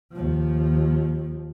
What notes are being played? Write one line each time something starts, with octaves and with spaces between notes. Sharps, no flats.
D#2 F3